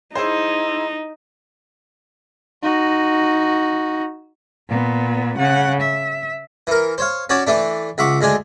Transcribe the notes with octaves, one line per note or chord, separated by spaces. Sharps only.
D#4 E4 G#4 C5
D#4 F#4
A#2 B3
C#3 F#5
E5
E3 A#4
C5 C#5 F5
C#4 F#4 C#5 D5 A5
E3 A3 D4
C#2 E5 F#5 C#6 D6
D2 G#3 D4 G#5